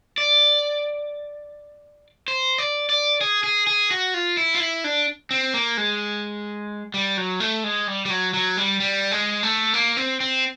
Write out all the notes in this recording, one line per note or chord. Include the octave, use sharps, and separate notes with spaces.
D5
C5
D5
D5
G#4
G#4
G#4
F#4
F4
E4
F4
E4
D4
C4
A#3
G#3
G3
F#3
A3
G#3
G3
G3
F#3
F#3
G3
G3
G#3
A3
A#3
C4
C4